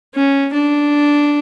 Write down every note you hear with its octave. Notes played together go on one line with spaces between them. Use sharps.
C#4
D4